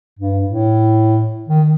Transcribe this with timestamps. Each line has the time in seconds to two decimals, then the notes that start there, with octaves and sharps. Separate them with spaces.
0.19 G2
0.45 A2
1.48 D#3